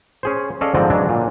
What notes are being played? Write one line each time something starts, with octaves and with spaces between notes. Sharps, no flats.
C#4 G#4 C5
C#4 A4 D5 D#5 F5
G#2 D3 F3 C4 D5 D#5
E3 F#3 G#3 D4
A#2